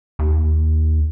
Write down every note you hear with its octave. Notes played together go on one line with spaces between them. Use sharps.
D#2